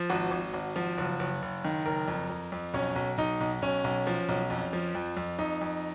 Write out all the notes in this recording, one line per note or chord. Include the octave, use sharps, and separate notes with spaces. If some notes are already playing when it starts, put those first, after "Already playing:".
Already playing: F3
G#1 F#4
G#1
G#1
F3
F#1
F#1
F#1
D#3
F#1 A#4
F2
F2
F2
B1 C#4
B1
B1 D#4
B1
B1 C#4
B1
F3
B1
F2
F3
F2
F2
F2 D#4
F2